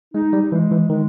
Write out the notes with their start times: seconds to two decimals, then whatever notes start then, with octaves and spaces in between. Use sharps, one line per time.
0.14 G#3 D#4
0.33 G3
0.52 E3 G#3
0.71 E3
0.90 D#3 G#3